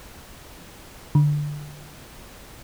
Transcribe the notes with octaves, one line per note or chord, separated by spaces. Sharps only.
D3